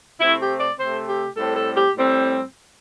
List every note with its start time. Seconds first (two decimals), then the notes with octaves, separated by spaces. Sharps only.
0.20 C3 A3 C4 E4
0.40 G4
0.59 D5
0.78 C3 A3 C4 C5
1.08 G4
1.37 A2 G3 C4 A4
1.56 A4
1.76 G4
1.95 A2 G3 C4